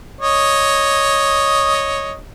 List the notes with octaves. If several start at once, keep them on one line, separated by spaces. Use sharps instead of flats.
C#5 D#5